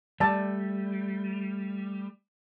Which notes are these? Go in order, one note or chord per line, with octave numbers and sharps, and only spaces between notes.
G3 A3 D5 A5